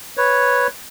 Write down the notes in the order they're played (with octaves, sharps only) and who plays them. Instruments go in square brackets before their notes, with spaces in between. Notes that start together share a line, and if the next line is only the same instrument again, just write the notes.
[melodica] B4 C#5